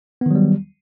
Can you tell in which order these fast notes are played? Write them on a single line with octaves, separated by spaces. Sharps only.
B3 D#3 F#3 G3